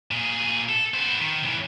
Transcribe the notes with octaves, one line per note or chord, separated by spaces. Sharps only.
A#2 G#4
A4
B3 C5
D#3
B1 E3